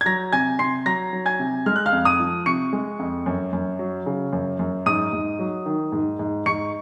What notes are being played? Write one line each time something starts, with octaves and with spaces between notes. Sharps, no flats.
G#6
F#3 A#5 A#6
C3 G#5 G#6
C3 C6 C7
F#3 A#5 A#6
F#3
G#5 G#6
C3
G#3 F6
F#6
F5 F6
F2
D#6 D#7
F3
C3 C#6 C#7
G#3
F2
F#2
F#2
F#3
C#3
F#2
F#2
G#2 D#6 D#7
G#2
F#3
D#3
G#2
G#2
G#2 C#6 C#7